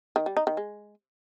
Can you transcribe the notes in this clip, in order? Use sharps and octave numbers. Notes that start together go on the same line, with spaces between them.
D#3
G3
D#4
D#3
G#3